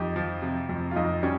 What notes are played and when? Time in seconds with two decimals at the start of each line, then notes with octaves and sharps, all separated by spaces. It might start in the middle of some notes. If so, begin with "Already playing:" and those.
Already playing: F2 D#4 G4
0.16 F3
0.42 C3
0.69 F2
0.91 F4
0.96 F2 D#4
1.23 G3 C#4